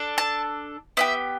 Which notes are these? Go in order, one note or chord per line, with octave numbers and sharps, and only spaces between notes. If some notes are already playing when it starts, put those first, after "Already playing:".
Already playing: D4 A4
A5
B3 E4 G4 E5